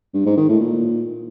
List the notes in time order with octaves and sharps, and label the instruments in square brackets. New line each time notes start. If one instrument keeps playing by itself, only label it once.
[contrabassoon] G2
G#2
D#3
A2
A#2